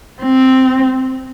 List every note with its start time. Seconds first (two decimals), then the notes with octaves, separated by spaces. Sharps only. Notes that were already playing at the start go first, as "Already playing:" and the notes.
0.22 C4